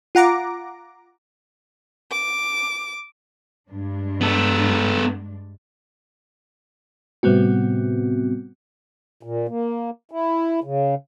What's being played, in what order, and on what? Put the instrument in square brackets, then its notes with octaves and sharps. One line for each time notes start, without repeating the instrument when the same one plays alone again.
[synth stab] F4 F#5 A#5 D6
[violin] D6
[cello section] G2 G#3 D4
[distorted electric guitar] B3 A4
[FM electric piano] A2 C3 G3 B3 C4 F#4
[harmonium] A#2
A#3
E4
C#3